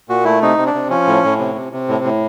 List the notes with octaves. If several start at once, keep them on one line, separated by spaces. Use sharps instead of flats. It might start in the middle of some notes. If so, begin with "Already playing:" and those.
A#2 F#4
A3 E4
C3 D#4
C3
D4
C3
F3 C#4
A2
A2
C3
C3
C3
A2
A2